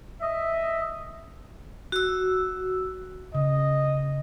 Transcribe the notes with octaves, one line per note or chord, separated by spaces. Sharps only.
D#5 E5
F#4 E6
C#3 D#5